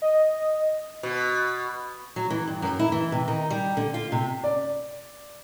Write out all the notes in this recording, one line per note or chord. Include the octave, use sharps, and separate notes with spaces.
D#5
B2
F#3
E3
G2
F#2
E4
E3
C3
D#3
G3
D3
F4
C3
D5